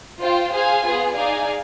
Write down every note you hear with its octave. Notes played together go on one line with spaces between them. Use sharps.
F4 C5 G5
G#4 C5 F5 G#5
B3 F4 G#4
D#4 G#4 D5 F5 G#5